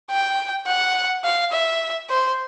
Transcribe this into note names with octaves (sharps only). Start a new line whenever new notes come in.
G5
F#5
F5
E5
C5